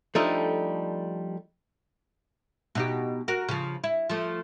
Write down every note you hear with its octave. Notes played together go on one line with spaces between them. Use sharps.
F3 G3 A3 D4 D#4 A4
B2 D#4 G4
F#4 A#4
C#3 F3
E4
F3 A3